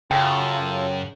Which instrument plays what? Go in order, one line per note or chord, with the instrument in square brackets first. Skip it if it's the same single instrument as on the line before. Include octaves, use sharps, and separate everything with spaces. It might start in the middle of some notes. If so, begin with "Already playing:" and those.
[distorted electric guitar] F#2 [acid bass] C#3 [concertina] F4 A4 [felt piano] G5